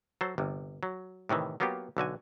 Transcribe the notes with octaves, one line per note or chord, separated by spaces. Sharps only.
F#3 A4 C5
G1 C3
F#3
A2 C3 D#3 E3
F#3 A#3 B3 F4 G4
B1 D3 F#4 G#5